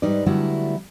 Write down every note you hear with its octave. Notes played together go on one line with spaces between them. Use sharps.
G#2 G3 D#4 B4 D5
D3 F#3 G3 A3 B3 E4